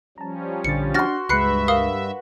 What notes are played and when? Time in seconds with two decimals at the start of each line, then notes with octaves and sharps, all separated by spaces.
0.18 F3 G3 C#4 A5 A#5
0.65 A#1 D3 A6 C#7
0.94 D4 F#4 C6 F6 A6 A#6
1.29 C#2 G2 G#3 B4 E5 F#6 C7 C#7
1.68 A#4 F5 D#6